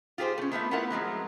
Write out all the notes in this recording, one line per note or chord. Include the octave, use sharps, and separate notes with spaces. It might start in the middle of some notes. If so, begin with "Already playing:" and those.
F4 G4 G#4 B4 C5
A3 C#4
A3 B3 F4 E5
A3 B3 E4 F4 A#4 F#5
F3 F#3 G#3 C4